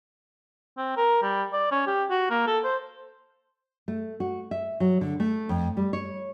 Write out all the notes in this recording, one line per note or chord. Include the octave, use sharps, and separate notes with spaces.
C4
A#4
G3
D5
C#4
G4
F#4
A#3
A4
C5
A3
F#4
E5
F#3
D3
A3
F2
G3
C#5